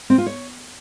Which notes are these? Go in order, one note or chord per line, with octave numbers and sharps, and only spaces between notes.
C4
F4
C#5